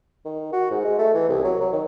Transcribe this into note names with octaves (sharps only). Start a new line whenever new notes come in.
D#3
F#4
G#2
G#3
A3
E3
C2
F#3
F#3
D#3